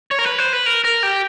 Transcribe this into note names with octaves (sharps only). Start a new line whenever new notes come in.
C#5
A#4
B4
C5
B4
A#4
A#4
G4